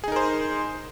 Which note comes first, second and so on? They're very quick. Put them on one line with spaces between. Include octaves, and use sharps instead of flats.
G#4 D#4 A#4 C5